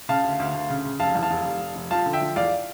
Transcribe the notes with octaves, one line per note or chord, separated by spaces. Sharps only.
C#3 F5 A5
D2
D2
D2
C#3
C#3
F1 F5 A5
E2
F5 A5
F1
F1
F1
F1
F3 F5 A5
D3
E5 G5
F3
E2 D5 F5